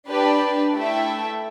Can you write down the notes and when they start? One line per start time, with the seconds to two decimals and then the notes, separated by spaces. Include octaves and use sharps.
0.09 D4 G4 B4 D5
0.73 A3 E4 A4 E5 G5